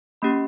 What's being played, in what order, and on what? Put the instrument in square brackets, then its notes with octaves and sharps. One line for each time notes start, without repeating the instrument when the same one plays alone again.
[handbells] A#3 C#4 G4 B5